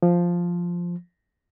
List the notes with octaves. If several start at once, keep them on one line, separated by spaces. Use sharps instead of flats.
F3